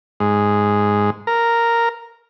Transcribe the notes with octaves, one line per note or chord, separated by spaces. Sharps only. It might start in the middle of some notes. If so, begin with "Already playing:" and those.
G#2
A#4